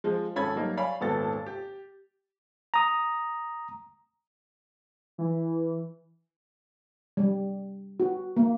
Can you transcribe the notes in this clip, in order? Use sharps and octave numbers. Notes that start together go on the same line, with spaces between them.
F3 G#3
G#1 C#4 A4 B5 G#6 A6
F#3 G3 A#3 D#4
C#5 D5 F5 G#5 B5
D#1 G#1 B3 A4 A5 A6
G4
A#5 D#6
E3
G3
F#4
A#3